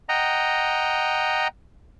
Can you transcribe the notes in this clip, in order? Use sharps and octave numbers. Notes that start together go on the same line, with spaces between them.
D#5 F#5 G5 A#5